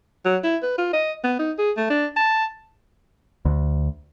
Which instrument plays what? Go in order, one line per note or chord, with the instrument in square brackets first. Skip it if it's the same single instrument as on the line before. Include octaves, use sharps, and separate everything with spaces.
[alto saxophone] F#3
E4
B4
F4
D#5
B3
D#4
G#4
A3
D4
A5
[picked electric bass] D2